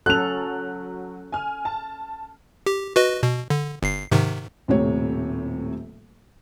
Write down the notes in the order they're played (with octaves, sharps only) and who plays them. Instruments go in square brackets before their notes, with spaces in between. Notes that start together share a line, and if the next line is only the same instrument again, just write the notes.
[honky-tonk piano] F#3 F6 [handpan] C#4 A4 [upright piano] F#6 F7
[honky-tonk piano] G#5 F6
A5
[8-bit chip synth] G4
F#4 B4 D#5
B2
D3
G1 C7
G#2 C3 D#3
[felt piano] D#1 A2 C3 C#5